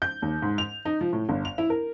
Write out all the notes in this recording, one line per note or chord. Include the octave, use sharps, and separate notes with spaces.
G6
D#2
G#2
F7
D#4
F3
A2
G1
F7
E4
A#4